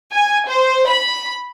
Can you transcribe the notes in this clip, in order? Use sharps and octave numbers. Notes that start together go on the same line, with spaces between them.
G#5
C5
B5